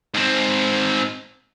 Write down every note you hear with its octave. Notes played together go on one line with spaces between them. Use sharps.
G#2 C4